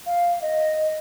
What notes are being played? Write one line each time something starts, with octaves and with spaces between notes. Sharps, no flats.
F5
D#5